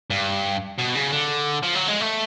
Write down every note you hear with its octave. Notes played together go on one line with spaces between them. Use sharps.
G2
B2
C#3
D3
F3
F#3
G#3
A3